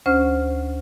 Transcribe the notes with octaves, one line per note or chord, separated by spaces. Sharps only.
D2 C#4 C5 F6